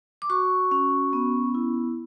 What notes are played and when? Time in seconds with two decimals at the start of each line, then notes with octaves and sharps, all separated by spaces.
0.22 D6
0.30 F#4 C#6
0.71 C#4
1.13 B3
1.54 E4